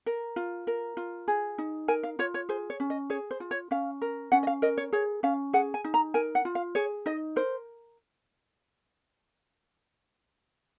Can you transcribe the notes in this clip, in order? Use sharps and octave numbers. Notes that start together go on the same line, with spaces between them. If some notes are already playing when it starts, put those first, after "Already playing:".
A#4
F4
A#4
F4
G#4
D#4
A#4 G#5
F5
F4 C#5
C#5
G#4 C5
C#5
C#4
D#5
G#4 C#5
C5
F4
C#5
C#4 F5
A#4
C#4 F#5
D#5
F5
A#4 D#5
C#5
G#4 C#5
C#4 F5
G#4 F#5
G#5
D#4
A#5
A#4 G#5
F#5
F4
F5
G#4 C#5
D#4 D#5
A#4 C5